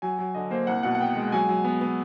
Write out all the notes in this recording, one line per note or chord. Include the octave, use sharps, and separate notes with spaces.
F#3 G#5
F#3
D3 D#5
A#3 C5
C2 F#5
B2 F#5
F#5
B3 G5
G#3
F#3 G#5
F#3
B3
B3